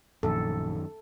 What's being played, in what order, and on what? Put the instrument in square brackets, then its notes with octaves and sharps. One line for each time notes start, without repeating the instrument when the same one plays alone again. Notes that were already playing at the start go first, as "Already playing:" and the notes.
[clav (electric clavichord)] A#1 [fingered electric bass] F#2 D#3 [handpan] A4